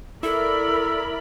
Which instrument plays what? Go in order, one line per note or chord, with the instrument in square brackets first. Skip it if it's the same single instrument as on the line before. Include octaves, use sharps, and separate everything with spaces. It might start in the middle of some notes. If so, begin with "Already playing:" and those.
[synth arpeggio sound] E4 [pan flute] A4 [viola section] A#4 D5 B5 [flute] E6